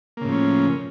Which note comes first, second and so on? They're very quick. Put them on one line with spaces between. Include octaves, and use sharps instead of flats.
A#3 C#3 A2 F3 C#4